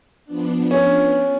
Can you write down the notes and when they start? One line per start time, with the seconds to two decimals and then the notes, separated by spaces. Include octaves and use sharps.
0.25 F3 B3 D4
0.71 C#4